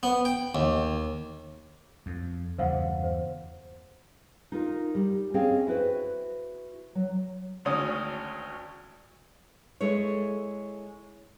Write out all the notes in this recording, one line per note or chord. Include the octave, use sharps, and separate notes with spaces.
B3
G5
D#2
F2
E2 G2 C#3 C5 F5 F#5
C5
D#4 F4 A#4
G3
C4 C#4 G#4 D#5 F5 G5
E4 F#4 B4 C5
F#3
G#1 D2 C#4 D#6
G#3 E4 A4 C#5